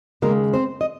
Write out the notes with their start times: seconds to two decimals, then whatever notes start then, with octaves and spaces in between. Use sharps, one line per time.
0.22 D#2 C#3 G#3 A#3 A#4
0.54 C4 C5
0.81 D#5